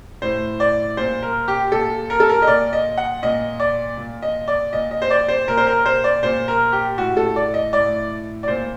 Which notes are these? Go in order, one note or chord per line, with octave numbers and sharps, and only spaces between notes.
A2 C5
D5
A#2 C5
A#4
G4
A#2 A4
A#4
A4
A#4
D#5
A#2 D5
D#5
F#5
A#2 D#5
D5
A#2
D#5
D5
A#2 D#5
D#5
C5
D5
C5
A#2 A#4
C5
A#4
C5
D5
A#2 C5
A#4
G4
A2 F#4
A4
D5
D#5
A2 D5
D5
A#2 C5